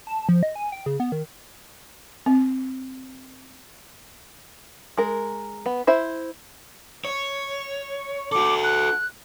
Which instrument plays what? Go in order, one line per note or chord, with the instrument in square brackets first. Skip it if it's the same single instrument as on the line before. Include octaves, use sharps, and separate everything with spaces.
[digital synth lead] A5
F3
D#5
G#5
G5
C#3
B3
D#3
[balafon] C4
[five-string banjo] G#3 A#4
B3
E4 C5 E5
[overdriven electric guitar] C#5
[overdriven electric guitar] F#4 A4 [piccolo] D6
[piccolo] F#6